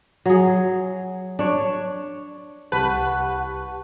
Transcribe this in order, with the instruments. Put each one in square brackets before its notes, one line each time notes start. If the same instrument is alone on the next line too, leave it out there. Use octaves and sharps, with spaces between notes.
[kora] F#3 G#4
D4 C#5
[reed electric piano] C2 A5 [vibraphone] G4 C#6 [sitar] B4 [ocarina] F#5